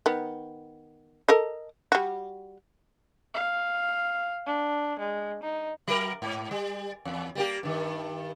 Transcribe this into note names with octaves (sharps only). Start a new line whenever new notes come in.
D#3 B3
A4 A#4 D#5
G3 F#4
F5
D4
G#3
D#4
F#3 A#4
G#2
G3
E2
G3 A#3 G4
G2 D#3